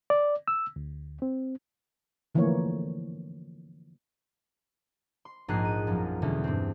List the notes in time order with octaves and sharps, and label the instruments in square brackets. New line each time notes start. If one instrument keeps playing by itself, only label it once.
[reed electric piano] D5
E6
D2
C4
[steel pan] D3 E3 F3 A3 A#3 C#5
[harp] C6
A#1 G#2 G#4 A#5 F#6 C7
D#7
F#2 F3 F#3
E2 B2 D3 E3 G3 C#4
G2 C4